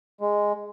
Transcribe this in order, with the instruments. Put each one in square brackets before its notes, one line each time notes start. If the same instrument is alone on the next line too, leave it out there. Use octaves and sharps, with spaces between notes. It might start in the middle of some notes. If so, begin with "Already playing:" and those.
[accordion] G#3